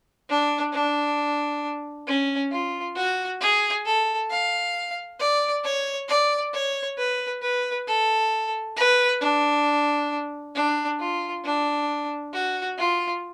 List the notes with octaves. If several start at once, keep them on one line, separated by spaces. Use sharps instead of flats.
D4
D4
C#4
F4
F#4
G#4
A4
F5
D5
C#5
D5
C#5
B4
B4
A4
B4
D4
D4
F4
D4
F#4
F4